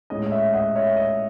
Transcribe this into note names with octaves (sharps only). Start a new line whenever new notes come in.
A2 G#3 C#4 D#5
D#5
C#5 E5
D#5 F#5
C#5 E5
D#5